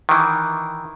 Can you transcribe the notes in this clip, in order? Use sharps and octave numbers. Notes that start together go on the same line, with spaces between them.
D#3 E3